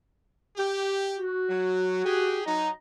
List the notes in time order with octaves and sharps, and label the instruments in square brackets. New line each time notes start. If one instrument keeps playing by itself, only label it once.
[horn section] G4
[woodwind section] F#4
[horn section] F#3
G4 G#4
[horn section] F#3 D#4 [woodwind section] A#5